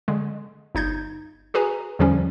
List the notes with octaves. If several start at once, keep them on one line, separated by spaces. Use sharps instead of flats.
D3 G#3
G1 D#4 G6 G#6
F#4 G#4 B4 G#5 A#5
E2 D3 F3 G3 C#4